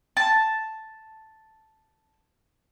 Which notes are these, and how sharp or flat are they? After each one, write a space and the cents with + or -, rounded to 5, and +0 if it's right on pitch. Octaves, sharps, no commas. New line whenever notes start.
A5 +0